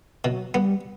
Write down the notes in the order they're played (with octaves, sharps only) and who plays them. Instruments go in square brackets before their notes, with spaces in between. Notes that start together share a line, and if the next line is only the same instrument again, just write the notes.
[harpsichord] B2 [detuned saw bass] F#3
[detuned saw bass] G3 [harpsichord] B3